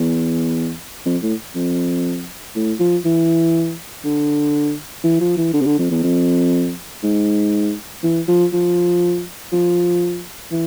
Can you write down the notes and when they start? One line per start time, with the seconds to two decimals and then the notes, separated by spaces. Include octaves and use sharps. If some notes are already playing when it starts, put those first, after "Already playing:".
Already playing: E2
1.06 F2
1.22 A2
1.55 F2
2.55 A2
2.80 F3
3.05 E3
4.04 D3
5.04 E3
5.20 F3
5.37 E3
5.53 D3
5.61 C3
5.66 D3
5.79 F2
5.91 E2
6.04 F2
7.03 G#2
8.03 E3
8.28 F3
8.53 F3
9.52 F3
10.52 E3